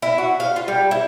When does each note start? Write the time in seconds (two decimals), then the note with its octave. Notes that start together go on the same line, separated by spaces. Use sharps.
0.02 E4
0.18 F#4
0.40 F5
0.56 F4
0.68 G3
0.91 E4